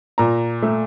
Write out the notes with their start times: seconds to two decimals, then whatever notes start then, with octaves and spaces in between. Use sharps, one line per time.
0.18 A#2 A#5
0.62 A3